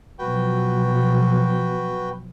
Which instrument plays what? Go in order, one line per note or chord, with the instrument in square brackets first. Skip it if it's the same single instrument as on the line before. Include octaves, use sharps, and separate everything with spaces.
[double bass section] B2 F3 F#3 [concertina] F#4 B4 G5